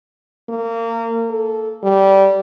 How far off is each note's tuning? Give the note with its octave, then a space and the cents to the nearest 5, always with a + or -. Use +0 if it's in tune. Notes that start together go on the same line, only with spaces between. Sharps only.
A#3 -25
A4 -10
G3 -15